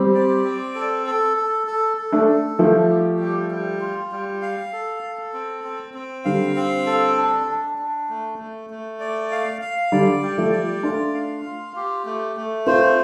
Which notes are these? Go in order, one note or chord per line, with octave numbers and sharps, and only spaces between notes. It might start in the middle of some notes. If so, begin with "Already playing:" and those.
Already playing: G3 C4 G4
D5
C4
A4
A4
A4
A4
A4
A3 D4
A4
F3 G3 A3
G4
G3
G3
F4
G3
F5
A4
A4
C4
C4
C4
D3 G3 F5
C4
A4
D4
D4
D4
A3
A3
A3
D5
F5
F5
D3 G3 D5
G3
F3 A3
D5
A3 D4 F4
F5
F4
G4
A3
A3
C4 F4 C5